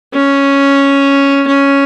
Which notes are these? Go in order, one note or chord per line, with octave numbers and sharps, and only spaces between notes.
C#4
C#4